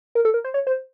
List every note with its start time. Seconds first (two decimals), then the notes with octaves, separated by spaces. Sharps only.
0.15 A#4
0.25 A4
0.34 A#4
0.45 C5
0.54 C#5
0.67 C5